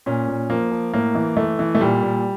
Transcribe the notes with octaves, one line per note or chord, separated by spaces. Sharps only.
A#2 C#4
A#2
F3 A#3
F3
A2 A#3
E3
E3 A3
E3
A3
A#2 G3
A#2